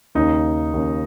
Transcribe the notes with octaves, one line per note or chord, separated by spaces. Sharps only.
D#2 C#3 D#4
D#2 C#3